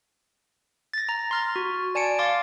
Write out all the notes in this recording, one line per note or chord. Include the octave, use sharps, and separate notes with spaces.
A6 A#6
A#5
C6 F6 A6
F#4
D5 G#5 A5 C#7 D7
F5 C6 D6 A6